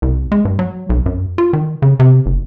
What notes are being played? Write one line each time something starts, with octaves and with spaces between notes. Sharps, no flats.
C2
G#3
G2
F#3
B1
F#2
F4
D#3
C#3
C3
F#1